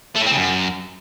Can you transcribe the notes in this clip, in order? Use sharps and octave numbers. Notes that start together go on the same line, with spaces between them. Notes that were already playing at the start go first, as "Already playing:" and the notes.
A3
A2
C4
C#3
F#2